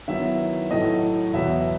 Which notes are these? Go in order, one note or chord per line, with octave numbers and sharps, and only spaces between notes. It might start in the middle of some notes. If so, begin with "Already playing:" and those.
D#3 F#3 B3 E4 E5
A2 F#3 A3 D#5
E2 B2 F#3 B3 E5